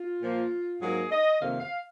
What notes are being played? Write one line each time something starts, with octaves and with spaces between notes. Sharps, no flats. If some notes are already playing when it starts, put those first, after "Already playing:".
Already playing: F4
A#2 F3 A#3
G#2 F#3 A#3 G#4
D#5
F2 C3 D#3 A#3 F5
F5